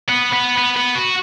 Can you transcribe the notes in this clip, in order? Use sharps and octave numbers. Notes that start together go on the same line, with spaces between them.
B3
B3
B3
B3
F#4